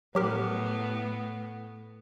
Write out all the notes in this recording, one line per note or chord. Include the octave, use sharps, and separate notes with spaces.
A2 F#3 B3 G4 A#4